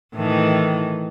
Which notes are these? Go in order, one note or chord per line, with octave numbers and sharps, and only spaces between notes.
A2 D#3 E3